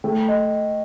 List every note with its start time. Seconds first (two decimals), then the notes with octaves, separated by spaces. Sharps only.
0.04 A3 G5
0.28 D#5